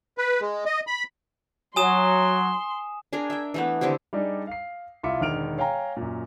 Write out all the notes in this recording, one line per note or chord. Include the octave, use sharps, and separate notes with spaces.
B4
G#3
D#5
B5
F#3 G#5 C6 D#6 E7
D4 G#4 A#4
E5 G5
E3 A3 B3
D3 C4 E4 G4
G3 D4 D#4 G#4
F5 C7
C2 E4 F4 E5 D6 C#7
E1 D3 D#3 F6 D7 F7
C#5 F5 G5 G#5 A#5
F#2 A#2